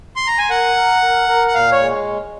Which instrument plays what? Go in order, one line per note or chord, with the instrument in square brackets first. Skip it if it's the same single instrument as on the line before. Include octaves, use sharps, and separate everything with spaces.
[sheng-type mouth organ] C6
A#5
G#5
[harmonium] A#4 [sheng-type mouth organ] F#5
[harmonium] A#4
A#4
A#4
[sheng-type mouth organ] F#5
[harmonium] A#2 [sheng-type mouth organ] F5
[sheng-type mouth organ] C#5
[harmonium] G#3